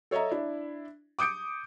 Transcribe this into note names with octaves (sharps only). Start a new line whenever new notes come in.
A4 C#5 D#5 E5 A#5
D4 E4
D6 D#6 G6 C#7 D7